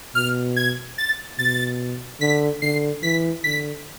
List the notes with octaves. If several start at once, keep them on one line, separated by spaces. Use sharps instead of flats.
B2 F6
G#6
A6
B2 A6
D3 B6
D3 C7
E3 B6
D3 B6